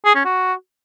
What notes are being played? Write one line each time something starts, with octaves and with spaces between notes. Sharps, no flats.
G#4
C#4
F#4